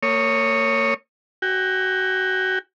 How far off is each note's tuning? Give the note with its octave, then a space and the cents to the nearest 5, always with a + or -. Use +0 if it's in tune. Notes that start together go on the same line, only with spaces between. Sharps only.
A#3 -35 C#5 +0 D#6 +0
F#4 +25 G5 +40